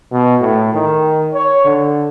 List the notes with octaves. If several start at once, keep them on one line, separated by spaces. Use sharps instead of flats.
B2
A2
D#3
C#5
D3